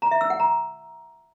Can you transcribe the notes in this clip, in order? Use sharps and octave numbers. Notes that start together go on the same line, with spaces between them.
A#5
E5
E6
F#5
A#5